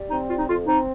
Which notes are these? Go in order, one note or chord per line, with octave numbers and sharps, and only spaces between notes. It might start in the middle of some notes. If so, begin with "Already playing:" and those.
Already playing: G3
C4 D#4
G3 F4
D#4
F2 F4
C4 D#4